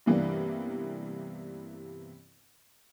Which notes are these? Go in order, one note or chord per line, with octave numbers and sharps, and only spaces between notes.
G2 C3 E3 A#3 B3 D4